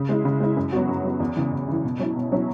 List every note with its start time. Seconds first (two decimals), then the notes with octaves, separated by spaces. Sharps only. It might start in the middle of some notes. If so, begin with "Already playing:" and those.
Already playing: C#3
0.09 G#3 E4
0.25 C#3
0.40 G#3 E4
0.57 F#2
0.72 F#3 B3 F#4
0.89 F#2
1.04 F#3 B3 F#4
1.20 E2
1.37 C#3 E3
1.52 E2
1.68 C#3 E3
1.84 B2
1.99 F#3 C#4 E4
2.16 B2
2.32 F#3 C#4 E4